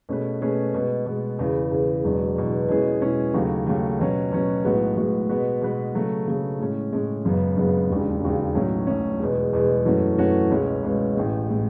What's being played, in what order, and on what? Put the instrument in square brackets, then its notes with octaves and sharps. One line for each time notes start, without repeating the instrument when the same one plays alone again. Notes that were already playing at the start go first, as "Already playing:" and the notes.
[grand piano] B2 A3 C#4 G#4 B4
B2 A3 C#4 G#4 B4
B2 G#3 B3
B2 G#3 B3
E2 C#3 E3
E2 C#3 E3
E1 E2 B2 F#3
E1 E2 B2 F#3
B2 G#3 C#4 E4 G#4
B2 G#3 C#4 E4 G#4
D#2 C#3 F#3 A3
D#2 C#3 F#3 A3
B2 F#3 C#4
B2 F#3 C#4
B1 A2 G#3 B3 F#4
B1 A2 G#3 B3 F#4
B2 G#3 B3 F#4 B4
B2 G#3 B3 F#4 B4
C#3 F#3 A3
C#3 F#3 A3
A2 G#3 C#4
A2 G#3 C#4
F#1 F#2 C#3 G#3 B3
F#1 F#2 C#3 G#3 B3
E1 D#2 C#3
E1 D#2 C#3
B1 A2 F#3 C#4
B1 A2 F#3 C#4
E2 B2 G#3
E2 B2 G#3
F#2 E3 A3 C#4 F#4
F#2 E3 A3 C#4 F#4
C#2 B2 G#3 C#4
C#2 B2 G#3 C#4
A1 A2 G#3
A2 G#3